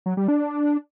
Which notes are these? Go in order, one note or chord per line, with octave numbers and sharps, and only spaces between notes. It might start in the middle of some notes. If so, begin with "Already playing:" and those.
F#3
G3
D4